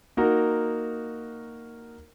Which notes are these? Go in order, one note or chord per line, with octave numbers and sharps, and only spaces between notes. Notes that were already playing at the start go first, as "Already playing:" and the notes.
A#3 D#4 F#4 A#4